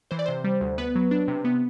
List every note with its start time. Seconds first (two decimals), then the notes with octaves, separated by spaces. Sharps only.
0.11 E3 C5
0.19 D5
0.26 C3 C5
0.44 G3
0.61 D2
0.78 B3 B4
0.95 F#3
1.11 D4
1.28 C3
1.45 B3